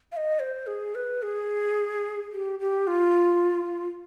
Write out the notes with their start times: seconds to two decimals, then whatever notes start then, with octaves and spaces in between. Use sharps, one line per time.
0.12 F5
0.17 D#5
0.40 C5
0.67 G#4
0.95 B4
1.22 G#4
2.32 G4
2.59 G4
2.87 F4